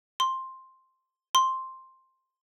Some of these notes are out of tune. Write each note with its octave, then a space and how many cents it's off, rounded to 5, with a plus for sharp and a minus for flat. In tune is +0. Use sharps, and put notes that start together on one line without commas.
C6 +5
C6 +5